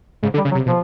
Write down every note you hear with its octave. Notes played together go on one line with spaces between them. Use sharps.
G#2 C#3
D3
G3
C#3
F#3
C3
B2 F3